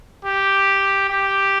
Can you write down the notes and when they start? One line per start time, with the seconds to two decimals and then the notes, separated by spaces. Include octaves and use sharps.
0.25 G4
1.10 G4